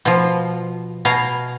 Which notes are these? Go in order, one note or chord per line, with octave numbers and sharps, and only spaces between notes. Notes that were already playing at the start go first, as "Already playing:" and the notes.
B2 F3
B2 F5 G#5 A#5